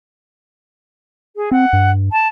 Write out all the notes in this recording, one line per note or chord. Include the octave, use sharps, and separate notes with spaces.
G#4
C4 F#5
G2
A5